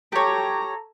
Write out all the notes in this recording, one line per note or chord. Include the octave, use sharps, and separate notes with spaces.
G4 A4 C#5 A#5